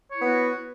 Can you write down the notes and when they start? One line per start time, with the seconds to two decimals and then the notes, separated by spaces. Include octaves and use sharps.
0.11 C#5
0.16 E4
0.21 B3
0.26 F#4